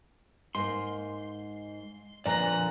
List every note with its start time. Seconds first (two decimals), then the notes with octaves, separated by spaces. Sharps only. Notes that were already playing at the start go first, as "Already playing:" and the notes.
0.55 G#2 A#3 C6
2.26 F2 A#2 D3 B4 D5 A#5 F#6